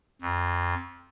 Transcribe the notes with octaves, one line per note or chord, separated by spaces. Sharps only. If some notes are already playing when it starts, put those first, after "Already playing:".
F2